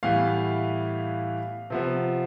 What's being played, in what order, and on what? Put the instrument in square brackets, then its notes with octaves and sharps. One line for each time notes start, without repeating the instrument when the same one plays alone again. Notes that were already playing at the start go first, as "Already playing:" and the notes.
[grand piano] A2 E3 G3 B3 F5
C3 F3 B3